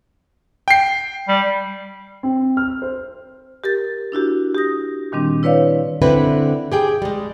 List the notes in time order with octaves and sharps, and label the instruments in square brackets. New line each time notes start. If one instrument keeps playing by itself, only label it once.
[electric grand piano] G5 C7
[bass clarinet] G3
[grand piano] C4
F6
C5
[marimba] G4 A#4 A6
D4 E4 F#4 G4
G4 D#6 A#6
A#2 D#3 G3 C4 D4
E4 B4 C#5 D5 F5
[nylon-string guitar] D3 C4 E4 B4
G4 G#4 G5
G3 G#3